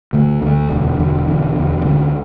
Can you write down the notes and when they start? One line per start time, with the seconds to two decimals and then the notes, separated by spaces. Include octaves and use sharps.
0.13 D2 D3 A3
0.42 D2 D3 A3
0.70 E1 E2 D3
0.99 E1 E2 D3
1.28 E1 E2 D3
1.56 E1 E2 D3
1.85 D2 D3 G#3 C#4